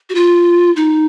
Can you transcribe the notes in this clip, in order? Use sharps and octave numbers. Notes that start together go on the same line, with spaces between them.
F#4
F4
D#4